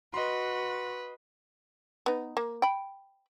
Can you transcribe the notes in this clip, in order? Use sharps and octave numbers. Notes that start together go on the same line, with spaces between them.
F#4 B4 D#5 C6
B3 D#4
A#3
G5 B5